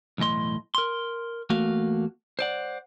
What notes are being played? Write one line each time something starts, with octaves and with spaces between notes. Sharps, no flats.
B1 E2 A2 D#5 C6
A#4 C6
E2 A3 A#3 F#4 F5
C5 D5 F#5